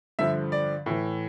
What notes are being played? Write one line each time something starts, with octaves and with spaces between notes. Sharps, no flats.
G2 D3 F3 E5
D5
A2 E3